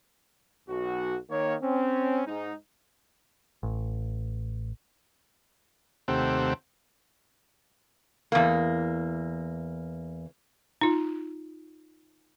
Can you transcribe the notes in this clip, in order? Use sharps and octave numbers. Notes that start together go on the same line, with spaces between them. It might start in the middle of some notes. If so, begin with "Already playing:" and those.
B1 F#4
D#3 A#3 C#5
C4 C#4
G#2 D#4
A1
D#2 C3 A3 C4 G4 F#5
E2 A#3
D#4 F4